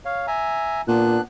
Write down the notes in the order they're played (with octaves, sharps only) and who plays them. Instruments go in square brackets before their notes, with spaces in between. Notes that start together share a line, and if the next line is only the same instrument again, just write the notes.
[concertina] C#5 F5
E5 G#5 A#5
[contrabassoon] A#2 [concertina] B3 D4 F#6